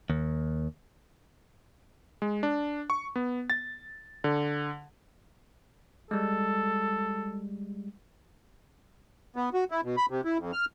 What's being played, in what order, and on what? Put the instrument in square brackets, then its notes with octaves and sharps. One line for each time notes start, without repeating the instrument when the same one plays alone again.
[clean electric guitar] D#2
[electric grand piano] G#3
D4
C#6
B3
A6
D3
[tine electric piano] G3 G#3 [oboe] A4
[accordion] B3
F#4
E4
B2
B5
C3
E4
F2
F6